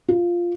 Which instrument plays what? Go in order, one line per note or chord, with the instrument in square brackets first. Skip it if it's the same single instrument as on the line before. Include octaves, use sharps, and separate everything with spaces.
[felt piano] F4